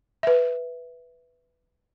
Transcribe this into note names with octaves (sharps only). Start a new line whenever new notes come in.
B4 E5